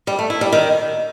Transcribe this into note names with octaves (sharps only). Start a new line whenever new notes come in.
G3
A3
E4
G3
D#3